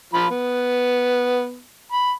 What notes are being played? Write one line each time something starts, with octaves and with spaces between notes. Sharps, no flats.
F3 F4 B5
B3
B5